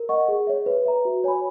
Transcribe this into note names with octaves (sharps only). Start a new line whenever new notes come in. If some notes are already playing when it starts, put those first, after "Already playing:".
Already playing: A#4
D#5 F#5 C#6
G#4
C#5 E5
B4
E5 A#5
F#4
C#5 G#5 B5